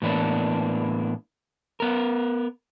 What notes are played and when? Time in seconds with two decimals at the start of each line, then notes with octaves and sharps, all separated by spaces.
0.02 A2 E3 A#3 B3 D4
1.80 B3 A#4